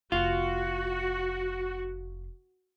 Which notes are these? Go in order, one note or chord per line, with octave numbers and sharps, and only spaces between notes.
F1 F4 F#4